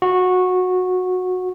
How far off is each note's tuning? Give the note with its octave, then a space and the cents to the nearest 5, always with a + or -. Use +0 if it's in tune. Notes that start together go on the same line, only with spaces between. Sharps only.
F#4 -15